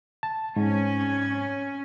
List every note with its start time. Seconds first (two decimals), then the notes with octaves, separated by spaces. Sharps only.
0.23 A5
0.56 G#2 C#4